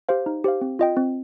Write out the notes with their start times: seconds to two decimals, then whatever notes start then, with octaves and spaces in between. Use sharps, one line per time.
0.09 G4 C5 F5
0.26 D#4
0.44 G4 C5 F5
0.61 C4
0.79 F4 D#5 G5
0.97 C4